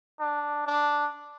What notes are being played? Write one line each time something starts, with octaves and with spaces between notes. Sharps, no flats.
D4
D4